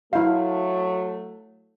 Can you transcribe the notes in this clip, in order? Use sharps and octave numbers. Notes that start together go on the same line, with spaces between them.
F#3 A3 E4 F5